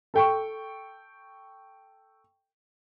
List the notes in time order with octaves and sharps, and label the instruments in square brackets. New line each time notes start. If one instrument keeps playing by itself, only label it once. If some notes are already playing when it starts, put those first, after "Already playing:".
[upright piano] A4 G5 C#6